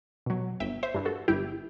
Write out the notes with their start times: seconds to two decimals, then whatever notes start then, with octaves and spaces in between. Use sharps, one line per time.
0.26 B2 F#3
0.60 G1 E5 G5
0.83 C5 E5
0.94 G2 E3
1.05 F#4 A4
1.28 G1 E4 G4